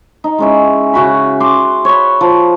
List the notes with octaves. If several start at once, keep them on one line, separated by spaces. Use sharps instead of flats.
D#4
G#3 C#4 E4
C#3 F#4 B5
C6 D6
C#5 B5
F3